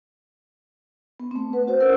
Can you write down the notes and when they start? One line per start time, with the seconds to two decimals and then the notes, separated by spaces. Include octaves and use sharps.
1.20 B3
1.31 A3 C4
1.53 B4 F#5
1.67 F#4 C5
1.80 C#4 A#4 F#5 E6